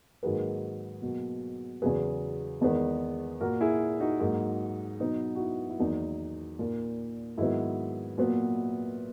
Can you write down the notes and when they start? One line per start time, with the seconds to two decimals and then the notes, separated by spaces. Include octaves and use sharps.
0.23 G#2 D#3 F#3 A#3 G#4 B4
1.02 B2 F#3 A#3
1.82 E2 C#3 F#3 G#4 B4
2.61 E2 D#3 G#3 B3
3.40 A#2 A#3 F#4 A#4
3.61 E4 G#4
4.00 D#4 F#4
4.20 G#2 F#3 A#3
5.00 B2 F#3 B3 D#4
5.35 F#4
5.40 E4
5.70 E4
5.79 E2 D#3 F#3 A#3 D#4
6.59 A#2 A#3
7.38 G#2 D#3 F#3 B3 E4
8.18 A#2 F#3 B3